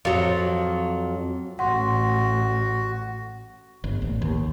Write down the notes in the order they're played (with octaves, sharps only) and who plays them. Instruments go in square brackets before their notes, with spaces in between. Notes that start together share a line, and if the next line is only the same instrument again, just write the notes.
[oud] F2 F#3
[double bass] A1 [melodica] F#4 [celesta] F#5 C6
[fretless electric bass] G1
A1
D#2